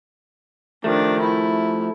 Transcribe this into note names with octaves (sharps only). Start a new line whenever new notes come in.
D#3 F3 A3 D4
E4